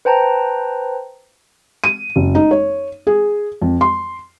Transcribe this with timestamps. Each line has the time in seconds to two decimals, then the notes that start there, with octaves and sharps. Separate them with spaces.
0.05 B4 C5 G5 A5 A#5
1.84 D#7
2.16 F#1
2.35 D#4
2.51 C#5
3.07 G#4
3.62 F2
3.81 C6